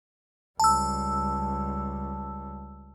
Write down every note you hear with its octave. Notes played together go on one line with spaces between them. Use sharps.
C#2 G3 A5 E6